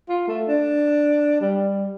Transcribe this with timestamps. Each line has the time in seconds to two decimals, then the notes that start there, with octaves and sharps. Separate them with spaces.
0.09 F4
0.27 A3
0.48 D4
1.41 G3